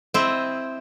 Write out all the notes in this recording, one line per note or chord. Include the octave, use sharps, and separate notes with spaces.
C4 E4 D#5